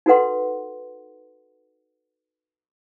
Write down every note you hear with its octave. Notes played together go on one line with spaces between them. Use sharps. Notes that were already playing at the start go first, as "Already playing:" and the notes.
D#4 F#4 A4 B4 F#5 C6